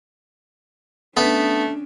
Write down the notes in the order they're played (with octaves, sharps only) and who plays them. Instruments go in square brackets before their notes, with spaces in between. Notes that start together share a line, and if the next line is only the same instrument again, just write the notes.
[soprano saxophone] A3 [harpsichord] B3 [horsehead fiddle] C#4 D4